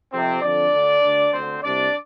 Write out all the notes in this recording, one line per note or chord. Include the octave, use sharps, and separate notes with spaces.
F2 C3 C4
F2 D3 D4 D5
D2 D3
D2 D3
D2 D3 C4 C5
C2 C3 D4 D5